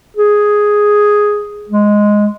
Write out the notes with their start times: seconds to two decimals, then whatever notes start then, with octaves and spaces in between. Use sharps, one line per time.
0.16 G#4
1.69 G#3